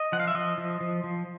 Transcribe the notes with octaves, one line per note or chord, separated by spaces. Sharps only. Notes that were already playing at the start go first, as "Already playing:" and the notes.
Already playing: D#5
F3 F#5
F5
E5
F3 D#5
F3
F3
F3